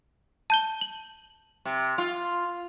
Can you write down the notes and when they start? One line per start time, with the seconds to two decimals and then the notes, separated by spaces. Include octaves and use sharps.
0.50 A5 G6 G7
0.81 F#7
1.65 C3
1.98 F4